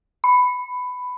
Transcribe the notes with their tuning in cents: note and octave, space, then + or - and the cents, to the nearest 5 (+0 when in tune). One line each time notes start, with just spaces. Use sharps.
B5 +15